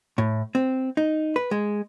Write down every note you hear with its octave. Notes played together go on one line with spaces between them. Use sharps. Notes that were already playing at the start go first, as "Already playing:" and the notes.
A2
C4
D#4
B4
G#3